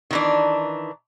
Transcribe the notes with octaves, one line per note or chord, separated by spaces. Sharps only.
D#3 E3 D4